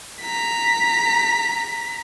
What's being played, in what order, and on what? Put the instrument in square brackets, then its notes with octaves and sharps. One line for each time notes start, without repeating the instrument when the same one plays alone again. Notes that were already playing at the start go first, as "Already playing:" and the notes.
[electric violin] A#5 B6